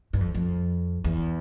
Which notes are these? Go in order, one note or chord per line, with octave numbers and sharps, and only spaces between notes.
G2
F2
F2
E2